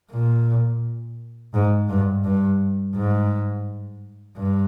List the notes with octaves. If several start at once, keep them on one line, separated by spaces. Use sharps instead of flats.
A#2
G#2
G2
G2
G#2
G2